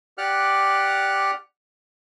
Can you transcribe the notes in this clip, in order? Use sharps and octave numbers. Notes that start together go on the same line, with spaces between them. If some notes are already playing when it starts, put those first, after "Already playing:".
G4 D5 F#5 F6 F#6